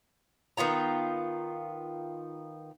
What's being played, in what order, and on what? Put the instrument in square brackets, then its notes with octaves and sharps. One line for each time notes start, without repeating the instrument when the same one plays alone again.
[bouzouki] D#3 B3 F4 A#5